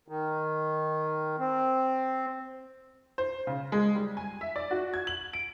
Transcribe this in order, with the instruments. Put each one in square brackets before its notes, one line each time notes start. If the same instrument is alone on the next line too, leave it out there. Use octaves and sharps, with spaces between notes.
[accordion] D#3
C4
[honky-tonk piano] C5
C#3
G#3
G3
G#5
E5
D5
F#4
G#6
F#7
D7